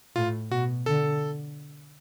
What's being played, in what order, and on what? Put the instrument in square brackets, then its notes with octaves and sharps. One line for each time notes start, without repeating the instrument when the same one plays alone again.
[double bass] A2 [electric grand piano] F4
[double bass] B2 [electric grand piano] F#4
[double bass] D3 [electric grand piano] A4